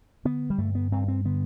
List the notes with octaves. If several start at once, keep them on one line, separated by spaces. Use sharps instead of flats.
D3 B3
G3
G2 A3
B3
G2 C4
C4
D3 B3